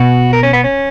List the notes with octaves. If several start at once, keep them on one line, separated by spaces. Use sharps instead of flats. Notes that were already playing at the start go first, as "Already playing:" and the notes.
Already playing: B2 F#4
A#4
C#4
B3
C#4